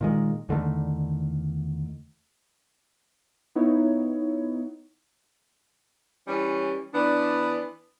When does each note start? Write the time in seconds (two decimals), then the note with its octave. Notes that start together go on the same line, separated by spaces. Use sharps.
0.01 A#2 D#3 G#3
0.49 E2 D3 D#3 A3
3.55 B3 D#4 E4 C#5
6.27 E3 G3 C#4
6.93 E3 B3 D4